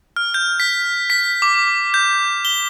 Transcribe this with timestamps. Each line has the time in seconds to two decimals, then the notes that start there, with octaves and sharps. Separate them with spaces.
0.16 F6
0.34 G6
0.60 B6
1.10 B6
1.42 D6
1.94 G6
2.45 G7